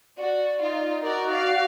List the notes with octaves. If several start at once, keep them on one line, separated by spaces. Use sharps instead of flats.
F#4 D5
D#4 F4
F#4 A#4 D5
D5 F5
F#5